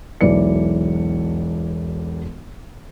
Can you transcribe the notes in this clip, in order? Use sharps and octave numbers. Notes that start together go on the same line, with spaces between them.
E1 B1 E3 D5 C#7